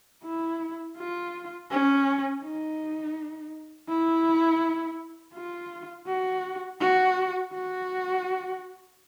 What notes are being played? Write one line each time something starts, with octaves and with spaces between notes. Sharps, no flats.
E4
F4
C#4
D#4
E4
F4
F#4
F#4
F#4